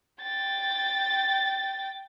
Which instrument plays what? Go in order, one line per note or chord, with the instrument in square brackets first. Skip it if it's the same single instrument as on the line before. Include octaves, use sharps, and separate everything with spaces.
[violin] G5 A6